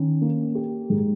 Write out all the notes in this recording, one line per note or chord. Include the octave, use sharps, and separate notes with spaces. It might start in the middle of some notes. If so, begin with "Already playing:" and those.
Already playing: D#3 C#4
A#3
G4
G#2